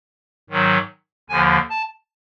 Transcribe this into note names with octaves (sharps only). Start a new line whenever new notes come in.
G#2 D#3 F#3
D#2 D3 F3 G#5
A5